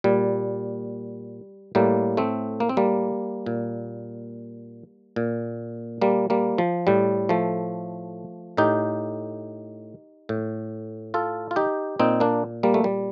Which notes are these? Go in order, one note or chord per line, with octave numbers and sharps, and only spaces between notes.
A#2 G3
A2 G3 A#3
A3 C4
A#3
C4
G3 A#3
A#2
A#2
G3 A#3
G3 A#3
F3
A2 G3
F3 A3
A2 D#4 G4
A2
F4 A4
F4
D#4 G4
A#2 C4 D#4
A#3 D4
G3 A#3
A3
G3